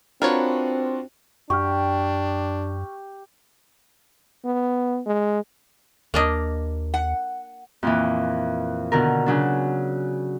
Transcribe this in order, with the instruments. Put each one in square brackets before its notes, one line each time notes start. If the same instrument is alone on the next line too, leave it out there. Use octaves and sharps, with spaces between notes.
[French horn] C4 [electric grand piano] D4 F4 F#4 [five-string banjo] A#4 B4 C#5
[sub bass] F#2 [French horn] D4 [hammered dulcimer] G4 [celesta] C#6 F6
[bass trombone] B3
G#3
[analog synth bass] D#2 [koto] A#3 D4 D#5
[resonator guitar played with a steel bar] F#5
[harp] F2 A#2 E3
B2 D3 D#3 A#4
C#3 F#3 D4